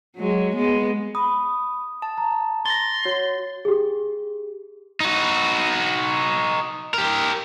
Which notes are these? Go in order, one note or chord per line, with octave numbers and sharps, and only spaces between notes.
F#3 G#3
G#3 B3
B5 D#6
A5
A#5
C6 A6 A#6
F#4 C#5
G4 G#4
D#4 F#4
G4 A#4